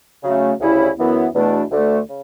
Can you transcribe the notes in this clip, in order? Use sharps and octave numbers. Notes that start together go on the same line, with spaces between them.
C#3 F#3 A3 C#4
D2 C#3 G3 C#4 E4
F#2 E3 B3 E4
E2 B2 A3 D4
D2 D3 A3
C#3